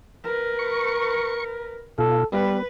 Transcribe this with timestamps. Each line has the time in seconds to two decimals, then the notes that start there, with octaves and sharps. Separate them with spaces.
0.24 A#4 B4
0.59 C#6
1.99 B2 F4 A4
2.32 G3 B3 B4